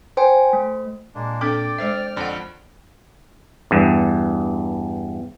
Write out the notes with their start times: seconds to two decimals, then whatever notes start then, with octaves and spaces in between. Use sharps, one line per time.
0.17 C5 G5 G#5
0.53 A3
1.15 A#2 G#3 A#3 D4
1.41 C4 D4 A4 D5 G5 D6
1.78 G#3 C5 E5 F6
2.16 F2 D3 D5 F#5 G5
3.71 E2 G2